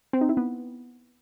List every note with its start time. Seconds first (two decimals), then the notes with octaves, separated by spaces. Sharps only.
0.13 C4
0.21 D#4
0.29 E4
0.37 B3